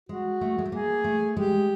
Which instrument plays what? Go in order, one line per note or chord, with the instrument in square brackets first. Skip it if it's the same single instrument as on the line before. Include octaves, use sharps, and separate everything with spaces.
[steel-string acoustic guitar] G#3 [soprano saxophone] F#4
[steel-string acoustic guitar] A3
G#3
A3
[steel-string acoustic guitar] A#3 [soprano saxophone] G#4
[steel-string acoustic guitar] A3
[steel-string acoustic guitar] G#3 [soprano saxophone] G4